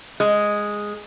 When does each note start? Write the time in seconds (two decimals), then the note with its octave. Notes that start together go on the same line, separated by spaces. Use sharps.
0.20 G#3